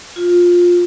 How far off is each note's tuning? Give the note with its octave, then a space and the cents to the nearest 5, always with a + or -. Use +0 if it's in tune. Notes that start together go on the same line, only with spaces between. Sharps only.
F4 +15